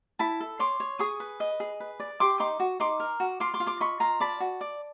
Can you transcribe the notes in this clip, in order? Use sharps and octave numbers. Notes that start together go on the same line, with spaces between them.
E4 A5 B5
A4
C#5 C6 D6
C#5
G#4 C#6 D#6
B4
D#5
G#4
B4
D5
G4 C6 D6
D#4 C6 D6
F#4
D#4 C6 D6
A#4
F#4
F4 C6 D6
C6 D6
F4
C6 D6
D#5 B5 C#6
F4 A#5 C6
D5 A5 B5
F#4
D5